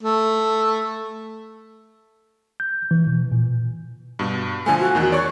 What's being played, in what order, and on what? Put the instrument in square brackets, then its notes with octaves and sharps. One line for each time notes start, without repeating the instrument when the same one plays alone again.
[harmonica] A3
[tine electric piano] G6
E3
B2
A#2
[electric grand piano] G2 B2
[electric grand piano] D3 F3 A3 [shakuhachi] G#5
[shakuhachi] F#4
[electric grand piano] E2 D#3 F#6
[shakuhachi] C#5 [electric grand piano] D5 C#6